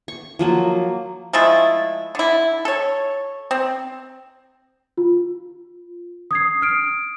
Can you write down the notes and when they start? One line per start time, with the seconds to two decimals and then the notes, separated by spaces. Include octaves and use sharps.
0.08 C#6
0.39 F3 F#3 A#3
1.33 F3 G#3 A3 E4
2.15 D3 E4
2.65 A4 C#5
3.51 C4
4.97 F4
6.31 D#6 G#6 C7
6.61 D#6 F6 D7